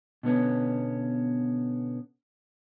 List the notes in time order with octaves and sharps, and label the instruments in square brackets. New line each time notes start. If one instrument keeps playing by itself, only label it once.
[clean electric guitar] B2 D3 B3 C#4